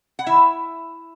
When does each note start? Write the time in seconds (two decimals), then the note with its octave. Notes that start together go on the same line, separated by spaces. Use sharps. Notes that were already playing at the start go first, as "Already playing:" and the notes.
0.19 F#5
0.26 D#3 E4 E5